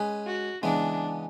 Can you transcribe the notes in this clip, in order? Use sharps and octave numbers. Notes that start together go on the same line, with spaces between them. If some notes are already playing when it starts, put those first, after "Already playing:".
Already playing: G#3 C#4 G#4 B4
F#4
C#3 E3 G#3 B3 D4